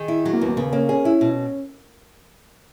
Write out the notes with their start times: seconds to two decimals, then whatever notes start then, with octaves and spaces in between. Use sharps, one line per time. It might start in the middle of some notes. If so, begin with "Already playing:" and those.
Already playing: D#3 G#4
0.08 E4
0.25 F#3 F#4
0.33 A#3
0.40 D#2 B3
0.49 A#3
0.56 C#3 B3
0.72 A#3 C#4
0.89 C#4 G#4
1.05 E4
1.21 B2